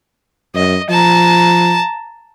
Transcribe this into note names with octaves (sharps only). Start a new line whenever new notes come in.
F#2 D#5
F3 A5 A#5